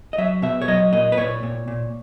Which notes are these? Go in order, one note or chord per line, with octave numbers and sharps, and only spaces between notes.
D#5
F#3 E5
B2 E5
C#5
F#3 D#5
A#2 D#5
B4
A#2 C#5
A#2
A#2